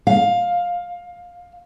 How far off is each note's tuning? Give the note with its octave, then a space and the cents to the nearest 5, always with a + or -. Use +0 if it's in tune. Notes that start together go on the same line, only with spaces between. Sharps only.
F5 +15